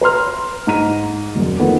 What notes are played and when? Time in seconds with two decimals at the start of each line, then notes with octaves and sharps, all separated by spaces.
0.01 B4 A#5 C6 F6
0.67 G#2 A#5 D#7
1.35 E1 F#2
1.60 D#3 F3 A3 B3